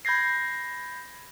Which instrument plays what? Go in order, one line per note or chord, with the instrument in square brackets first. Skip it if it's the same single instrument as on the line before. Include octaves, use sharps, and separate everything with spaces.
[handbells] B5 G6 G#6 A#6 C7